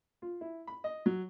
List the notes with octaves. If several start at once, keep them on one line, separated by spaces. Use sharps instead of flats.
F4
E4
B5
D#5
F#3